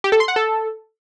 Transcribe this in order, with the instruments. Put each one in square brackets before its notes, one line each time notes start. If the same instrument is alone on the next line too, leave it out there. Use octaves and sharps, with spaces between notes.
[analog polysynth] G4
A4
C6
F#5
A4